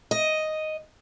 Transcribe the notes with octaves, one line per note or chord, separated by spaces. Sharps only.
D#5